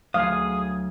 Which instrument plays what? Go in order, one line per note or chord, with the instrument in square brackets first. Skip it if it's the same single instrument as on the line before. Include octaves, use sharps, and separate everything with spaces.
[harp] D2 F#3 A3 [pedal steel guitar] G#4 D#6 [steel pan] F5